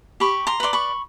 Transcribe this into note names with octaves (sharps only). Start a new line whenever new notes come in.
G4 B5 C#6
A#5 C6
B4 D5 C6
B5 C#6